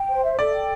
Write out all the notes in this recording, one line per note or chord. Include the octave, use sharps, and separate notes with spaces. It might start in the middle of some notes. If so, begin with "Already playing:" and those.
Already playing: G5
C5
E5
A4 D5
G5